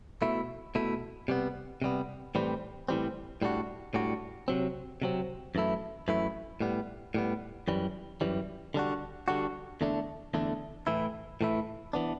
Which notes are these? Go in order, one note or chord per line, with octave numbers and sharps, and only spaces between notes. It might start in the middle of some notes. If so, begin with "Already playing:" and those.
B2 A3 E4
B2 A3 E4
C3 G3 B3
C3 G3 B3
A2 E3 G3 C4
A2 E3 G3 C4
A2 G3 D4 F#4
A2 G3 D4 F#4
C3 F#3 C4
C3 F#3 C4
F#2 E3 A3 E4
F#2 E3 A3 E4
A2 G3 B3
A2 G3 B3
F#2 E3 G3
F#2 E3 G3
D3 G3 D4 F#4
D3 G3 D4 F#4
E2 D3 A3 D4
E2 D3 A3 D4
A2 E3 A3 E4
A2 E3 A3 E4
E3 B3 D4